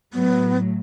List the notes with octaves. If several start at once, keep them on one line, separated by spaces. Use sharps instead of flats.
A2 F#3 B3